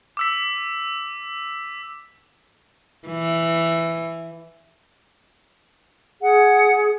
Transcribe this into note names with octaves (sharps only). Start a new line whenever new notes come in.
D6 E6 B6
E3
G#4 F#5